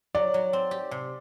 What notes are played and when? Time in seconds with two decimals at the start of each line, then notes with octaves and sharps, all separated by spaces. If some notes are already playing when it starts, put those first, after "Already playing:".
0.15 F#3 D5
0.34 F#3
0.53 C4
0.71 G4
0.91 C3